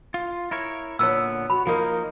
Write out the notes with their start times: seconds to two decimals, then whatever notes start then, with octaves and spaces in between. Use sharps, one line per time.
0.14 F4
0.51 E4 A#4 C#5
0.99 A#2 D3 B3 C#5 E6
1.50 F#4 B5
1.67 F3 A#3 D#4 A#4